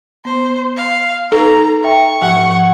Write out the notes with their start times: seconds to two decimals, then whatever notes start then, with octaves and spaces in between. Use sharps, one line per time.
0.25 B3 C5
0.77 F5
1.32 D#4 A4 B4 A#5
1.84 E5 G5 C#6
2.22 G#2 F3 F#5